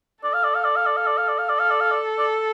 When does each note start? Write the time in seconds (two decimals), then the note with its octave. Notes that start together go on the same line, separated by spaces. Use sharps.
0.24 A4 D5
0.33 F5
0.44 D5
0.55 F5
0.65 D5
0.76 F5
0.86 D5
0.97 F5
1.07 D5
1.18 F5
1.29 D5
1.38 F5
1.49 A4 D5
1.60 F5
1.70 D5
1.80 F5
1.91 D5
2.19 D5